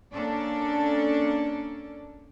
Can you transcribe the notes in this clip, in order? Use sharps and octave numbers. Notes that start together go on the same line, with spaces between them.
A#3 C#4 D4 A4 D5